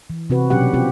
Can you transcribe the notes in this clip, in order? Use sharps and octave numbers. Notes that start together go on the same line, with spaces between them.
E3
C3 C4 F#4 B4
B2 F#3 C#4 D4 G4 F#5
C4 F4 G4